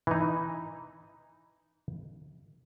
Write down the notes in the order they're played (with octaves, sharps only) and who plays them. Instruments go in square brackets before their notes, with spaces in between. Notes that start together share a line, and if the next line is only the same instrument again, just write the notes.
[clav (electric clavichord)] E3 D#4